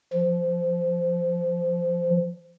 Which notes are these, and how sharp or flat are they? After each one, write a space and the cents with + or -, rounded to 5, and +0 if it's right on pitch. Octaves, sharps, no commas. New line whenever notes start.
F3 -15